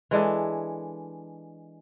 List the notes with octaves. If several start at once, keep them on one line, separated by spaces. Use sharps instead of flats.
E3 G#3 D4 A4